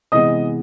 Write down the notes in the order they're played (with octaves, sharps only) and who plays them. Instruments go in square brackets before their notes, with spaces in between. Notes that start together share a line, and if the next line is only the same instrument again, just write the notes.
[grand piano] C3 E3 G#3 B3 [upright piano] D#5 D#6